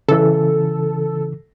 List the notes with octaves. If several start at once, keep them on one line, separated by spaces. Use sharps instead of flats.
C#3 E3 A4